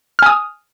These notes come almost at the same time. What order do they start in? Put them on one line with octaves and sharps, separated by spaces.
F6 G#5 D#6